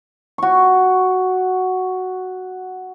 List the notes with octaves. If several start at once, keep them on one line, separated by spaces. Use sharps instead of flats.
F#4 C#6